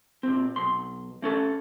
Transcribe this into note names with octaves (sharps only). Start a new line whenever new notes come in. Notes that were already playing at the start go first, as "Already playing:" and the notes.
A#2 C4
B1 C6
A3 C#4 A4